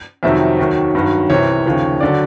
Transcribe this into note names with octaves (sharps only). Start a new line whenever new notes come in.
F2 C3 D#3 F#3 E5
D#2 D#3 F#3
G2 D#3 F#3
C2 C3 E3 C#5
D#2 C#3 F3
D3 F#3 D5